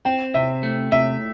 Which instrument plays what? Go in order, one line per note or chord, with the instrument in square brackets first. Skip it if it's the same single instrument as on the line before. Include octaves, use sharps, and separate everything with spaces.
[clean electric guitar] C4 [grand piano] G5
[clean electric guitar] C3 [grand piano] E5
[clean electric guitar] A3
[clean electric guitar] C3 [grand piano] E5